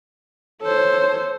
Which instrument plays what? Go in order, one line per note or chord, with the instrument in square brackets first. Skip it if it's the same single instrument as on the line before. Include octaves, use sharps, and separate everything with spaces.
[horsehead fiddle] A4 C5 [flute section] C#5